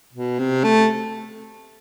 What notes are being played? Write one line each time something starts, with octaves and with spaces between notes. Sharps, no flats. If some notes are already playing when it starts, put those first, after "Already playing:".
B2
C3
A3